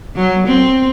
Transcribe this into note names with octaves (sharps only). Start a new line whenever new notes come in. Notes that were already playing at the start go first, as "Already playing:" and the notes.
F#3
C4